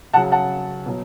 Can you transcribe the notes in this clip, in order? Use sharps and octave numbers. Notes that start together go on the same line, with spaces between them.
C#3 F#3 F#5 A5
F#5 A5
B2 F#3